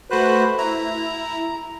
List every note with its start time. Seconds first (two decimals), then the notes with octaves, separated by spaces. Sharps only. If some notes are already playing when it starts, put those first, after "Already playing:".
0.10 A3 F#4 B4 C5 F#6
0.58 E4 A#5